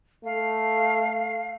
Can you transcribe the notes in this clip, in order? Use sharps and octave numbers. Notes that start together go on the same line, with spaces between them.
A3 F5